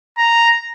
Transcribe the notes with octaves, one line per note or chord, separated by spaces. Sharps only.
A#5